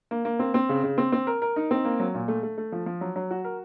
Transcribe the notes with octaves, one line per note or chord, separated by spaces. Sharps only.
A#3
A#3
C4
C4
C#3
C#3
C4
C4
A#4
A#4
D#4
C4
A#3
F#3
A#2
A3
A3
A3
F3
F3
F#3
F#3
F#4
A#4